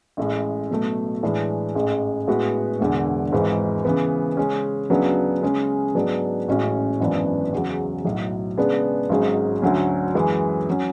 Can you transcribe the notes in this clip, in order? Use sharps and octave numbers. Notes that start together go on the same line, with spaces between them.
A1 A2 G#3
B2 F#3 A3
A2 E3 G#3 D4
A1 G#2 G#3
A2 G#3 B3 F#4 B4
E1 E2 D3
G#1 G#2 E3
C#3 E3 B3
C#3 G#3 C#4
D2 C#3 F#3 B3 D4
C#3 G#3 C#4
G#2 F#3 B3 D4 G#4
A1 A2 G#3 C#4 F#4
G#1 F#2 E3 B3 D4
E2 C#3 F#3
B1 A2 F#3
C#3 G#3 B3 D4 G#4
G#1 G#2 F#3 C#4 G#4
D2 D3 F#3 C#4
F#2 E3 G#3 C#4
F#3 C#4